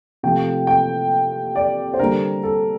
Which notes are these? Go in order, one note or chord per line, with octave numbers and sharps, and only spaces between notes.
C3 F3 A3 G5
G5
D5
C5
D3 G3 A#4
A4